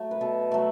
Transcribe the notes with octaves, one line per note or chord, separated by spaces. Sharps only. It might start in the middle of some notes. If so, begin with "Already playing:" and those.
Already playing: F#3 A3
B4
B2 A4
F#3 A3